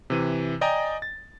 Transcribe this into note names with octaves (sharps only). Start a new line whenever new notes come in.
C3 E3 D#7
D5 D#5 G5 G#5 A#5
A6